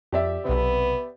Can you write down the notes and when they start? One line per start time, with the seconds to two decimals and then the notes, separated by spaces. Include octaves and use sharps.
0.12 F2 G4 D5 E5
0.45 B1 C3 B3